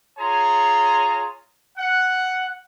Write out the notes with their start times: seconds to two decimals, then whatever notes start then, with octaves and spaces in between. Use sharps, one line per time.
0.18 F4 G#4 C#5 G#5 A#5 C6
1.77 F#5